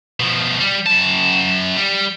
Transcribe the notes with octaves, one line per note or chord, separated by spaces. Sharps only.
B2 F3
G3
F#2 A5
G3